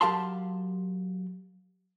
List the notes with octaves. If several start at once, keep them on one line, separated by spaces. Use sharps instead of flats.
F#3 G4 A#4 F5 A5 C6